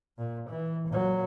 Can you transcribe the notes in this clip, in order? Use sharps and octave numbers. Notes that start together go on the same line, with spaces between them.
A#2
E3
A#2 F#3